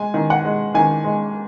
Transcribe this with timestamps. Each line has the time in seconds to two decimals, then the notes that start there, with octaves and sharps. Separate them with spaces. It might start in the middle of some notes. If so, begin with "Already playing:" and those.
Already playing: G#3 G#5
0.14 D#3
0.30 F#5
0.45 G#3
0.75 D#3 G#5
1.04 G#3